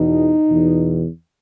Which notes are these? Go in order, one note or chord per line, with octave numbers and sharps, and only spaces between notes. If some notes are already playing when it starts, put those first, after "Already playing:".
Already playing: E2 B2 D#4
E2 B2